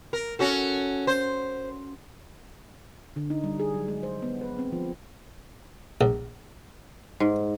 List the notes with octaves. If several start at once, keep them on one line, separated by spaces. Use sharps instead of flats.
A#4
C#4 F#4 A4
C5
D3
D#4
G3
G#4
F#3
G#3
C5
B3
B4
C4
F3
A#1
G#2